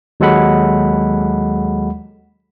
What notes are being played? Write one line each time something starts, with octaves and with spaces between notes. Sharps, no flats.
D#2 F#3 G#3 A4 F#5 B5